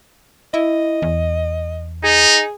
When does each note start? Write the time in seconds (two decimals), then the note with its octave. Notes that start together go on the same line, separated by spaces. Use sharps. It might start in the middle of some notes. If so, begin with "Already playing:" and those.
0.54 E4 D#5
1.02 E2
2.04 D#4 G#4